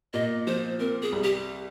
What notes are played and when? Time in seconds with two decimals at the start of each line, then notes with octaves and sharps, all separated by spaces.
0.13 A#2 D#5
0.47 F3 C5
0.80 C4 A#4
1.02 G#4
1.12 C2
1.24 G4